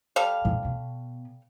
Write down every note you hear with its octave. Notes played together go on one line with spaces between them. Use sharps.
G3 A4 F5
F2 A#2
B2